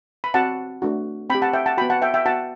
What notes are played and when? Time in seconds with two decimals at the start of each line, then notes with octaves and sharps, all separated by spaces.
0.24 B5
0.34 C4 F#4 F#5 A5
0.82 A3 D4 F#4
1.30 C4 G5 B5
1.35 G4
1.42 F#5 A5
1.53 E5 G5
1.66 F#5 A5
1.77 F#4 G5 B5
1.82 B3
1.90 F#5 A5
2.02 E5 G5
2.14 E5 G5
2.26 B3 F#4 F#5 A5